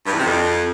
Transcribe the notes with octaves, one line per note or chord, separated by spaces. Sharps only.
G2
E2
C3
F2